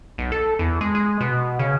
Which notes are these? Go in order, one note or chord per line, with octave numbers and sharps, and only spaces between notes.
B1
A4
E2
G#3
G#3
B2
C#3